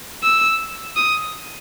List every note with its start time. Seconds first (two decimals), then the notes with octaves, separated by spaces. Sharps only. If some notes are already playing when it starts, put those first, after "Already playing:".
0.23 E6
0.96 D#6